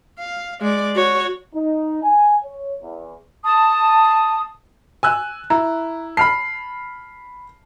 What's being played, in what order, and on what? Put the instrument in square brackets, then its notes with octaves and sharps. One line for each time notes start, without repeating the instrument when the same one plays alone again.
[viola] F5
G#3 D5
F#4 C#5
[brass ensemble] D#4
G#5
C#5
E2
[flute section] A5 D#6
[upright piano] G#5 E6 F#6
[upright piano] E4 [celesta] A#5
[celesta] A5 [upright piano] B5 F6 C7